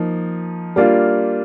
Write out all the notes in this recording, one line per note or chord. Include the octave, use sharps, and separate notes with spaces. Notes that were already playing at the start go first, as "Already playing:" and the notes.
Already playing: F3 A#3 D#4
G3 A#3 D4 F4